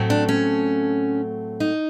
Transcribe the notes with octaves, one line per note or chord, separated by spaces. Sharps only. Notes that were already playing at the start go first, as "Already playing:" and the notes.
Already playing: A2 F#3 A3 C4
D4
C#4
D#4